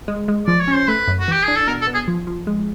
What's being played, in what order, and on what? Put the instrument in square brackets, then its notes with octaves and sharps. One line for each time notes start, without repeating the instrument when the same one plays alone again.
[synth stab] G#3
G#3
[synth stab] F3 [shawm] D5
[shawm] C#5
[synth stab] C#4
[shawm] C5
[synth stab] A3 [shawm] B4
[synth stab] F#2
[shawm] F#4
[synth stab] E3 [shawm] G4
[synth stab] D4 [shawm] G#4
[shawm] A4
[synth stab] B2 [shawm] A#4
[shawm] A4
[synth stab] B3
[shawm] G#4
[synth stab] F3
F3
G#3